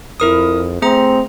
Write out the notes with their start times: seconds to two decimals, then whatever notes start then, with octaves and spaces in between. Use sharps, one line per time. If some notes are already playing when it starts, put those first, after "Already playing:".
0.20 F2 E4 A#4 D#6
0.82 A3 C4 G#4 A#5